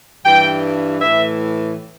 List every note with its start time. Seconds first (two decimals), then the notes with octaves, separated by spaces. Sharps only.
0.25 G2 E3 G5
1.00 A2 E3 E5